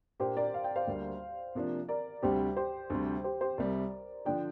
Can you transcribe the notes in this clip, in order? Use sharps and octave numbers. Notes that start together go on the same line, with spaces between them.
A#2 A#3 D4 G4 C5
A#4 D5
F5
G5
C5 F5
D2 D3 G3 A#3
C3 F3 A#3 D4
A#4 D5
D2 C3 G3 G4 C5
G4 C5
D2 C3 G3
G4 C5
G4 C5
C2 C3 G3 A#4 D5
D3 F3 D4 D5 G5